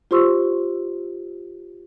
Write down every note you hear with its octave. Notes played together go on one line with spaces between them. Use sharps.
F4 G4 C5 C6 C#6 E6